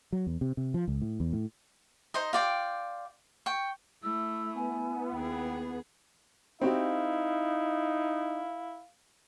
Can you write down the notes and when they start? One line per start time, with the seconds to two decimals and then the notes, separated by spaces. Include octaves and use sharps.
0.12 F#3
0.27 E2
0.41 C3
0.57 C3
0.74 F3
0.88 C#2
1.02 A2
1.20 E2
1.33 A2
2.14 D#4 C5 D#5
2.33 F4 D5 G5
3.46 G5 C#6
4.03 A3 E4 E6
4.55 B3 G#5
5.12 D#2 G#4 G5
6.61 C4 D#4 E4 F#4 G4 F5